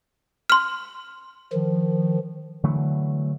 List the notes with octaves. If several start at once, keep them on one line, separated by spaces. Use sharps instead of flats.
C6 F6
D#3 F3
D3 E3 F#3 A3